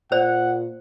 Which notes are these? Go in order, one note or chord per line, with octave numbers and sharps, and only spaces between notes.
A#2 C5 D5 F#5